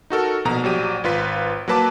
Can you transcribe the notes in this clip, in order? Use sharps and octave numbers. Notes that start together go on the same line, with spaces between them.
D#4 F#4 A4 A#4
A#1 B2 A#5
A#1 F#3 G4 D#7
G#1 F4 B4 B6
F#3 A#3 B4 A5 D6